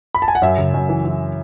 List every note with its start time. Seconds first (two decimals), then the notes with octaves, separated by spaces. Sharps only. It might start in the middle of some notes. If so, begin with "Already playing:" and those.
0.15 B5
0.22 A5
0.28 G#5
0.35 F#5
0.42 F#2 E5
0.58 C#3
0.74 F#2
0.89 E3
1.05 E3